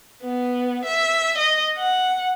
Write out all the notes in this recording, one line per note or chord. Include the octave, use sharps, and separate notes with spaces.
B3
E5
D#5
F#5